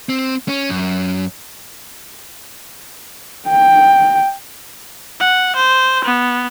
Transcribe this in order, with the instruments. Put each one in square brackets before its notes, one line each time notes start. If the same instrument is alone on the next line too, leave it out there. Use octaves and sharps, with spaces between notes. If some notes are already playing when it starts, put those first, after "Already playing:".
[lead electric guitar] C4
C#4
F#2
[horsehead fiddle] G5
[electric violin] F#5
C5
B3